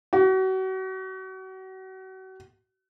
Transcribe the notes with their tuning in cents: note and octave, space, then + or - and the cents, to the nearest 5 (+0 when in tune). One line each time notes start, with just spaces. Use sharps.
F#4 +35